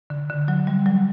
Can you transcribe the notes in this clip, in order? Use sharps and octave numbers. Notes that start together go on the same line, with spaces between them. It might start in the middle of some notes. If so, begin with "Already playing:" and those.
D3
D3
F#3
G3
F#3